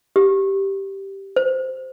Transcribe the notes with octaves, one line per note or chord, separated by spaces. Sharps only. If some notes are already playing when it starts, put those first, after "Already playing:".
G4
C5